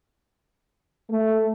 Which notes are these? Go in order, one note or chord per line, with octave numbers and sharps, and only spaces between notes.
A3